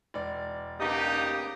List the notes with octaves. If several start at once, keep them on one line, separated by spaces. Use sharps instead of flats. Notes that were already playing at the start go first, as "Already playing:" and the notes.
E1 D5
C#3 A#3 B3 D4 D#4 G4 D#6